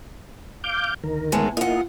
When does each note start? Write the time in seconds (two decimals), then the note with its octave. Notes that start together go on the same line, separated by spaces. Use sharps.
0.64 F5 D6 G6
1.04 D2 D#3 A#4
1.32 A2 G#3 B3
1.57 A#3 E4 F4 D#5 F#5